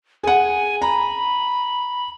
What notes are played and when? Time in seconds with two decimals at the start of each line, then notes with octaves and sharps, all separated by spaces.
0.23 G#4 F#5 G#5
0.82 A#5 B5